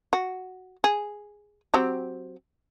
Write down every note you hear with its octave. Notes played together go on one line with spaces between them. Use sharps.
F#4
G#4
F#3 C4 G4